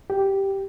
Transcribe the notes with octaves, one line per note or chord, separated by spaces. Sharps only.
G4